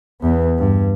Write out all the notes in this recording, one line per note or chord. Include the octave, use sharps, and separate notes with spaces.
E2 B3
G2